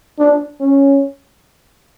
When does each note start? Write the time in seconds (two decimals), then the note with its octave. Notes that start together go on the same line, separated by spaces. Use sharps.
0.19 D4
0.60 C#4